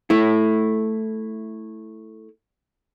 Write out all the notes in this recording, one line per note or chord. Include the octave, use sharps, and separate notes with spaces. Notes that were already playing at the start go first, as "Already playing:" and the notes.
A3 E4